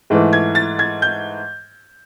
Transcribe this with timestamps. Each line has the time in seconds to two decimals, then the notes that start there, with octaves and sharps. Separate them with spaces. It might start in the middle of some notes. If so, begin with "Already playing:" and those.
0.10 G#2 E3 A3
0.33 G#6
0.55 A6
0.79 G#6
1.02 G6